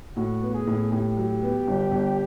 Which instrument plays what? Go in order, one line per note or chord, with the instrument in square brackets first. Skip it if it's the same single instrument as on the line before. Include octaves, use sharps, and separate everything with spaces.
[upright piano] A2 [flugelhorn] F#4
[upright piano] B3
[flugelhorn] G#4
[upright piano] A2
[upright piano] A2 [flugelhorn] G4
[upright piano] F#3
B3
G1
G1